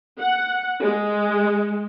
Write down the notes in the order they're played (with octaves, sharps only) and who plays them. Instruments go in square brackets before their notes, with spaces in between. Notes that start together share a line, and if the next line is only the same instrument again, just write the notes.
[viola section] F#5
G#3